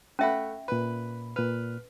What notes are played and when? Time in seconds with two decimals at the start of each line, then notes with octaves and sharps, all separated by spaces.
0.19 A3 C#4 E5 F#5 B5
0.68 A#2 B4 B5
1.36 A#2 B4 F6